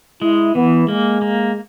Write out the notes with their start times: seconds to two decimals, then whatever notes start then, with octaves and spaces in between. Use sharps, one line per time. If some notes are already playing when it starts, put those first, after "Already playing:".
0.22 G#3 E4
0.55 E3 B3
0.88 G#3 A#3
1.22 A#3